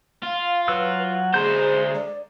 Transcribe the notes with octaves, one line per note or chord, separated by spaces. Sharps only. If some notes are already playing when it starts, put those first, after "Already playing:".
F4 F5
F#3 F#4 B4 E6
F#5
D3 G#3 G#4 C5 A#5 G6
D5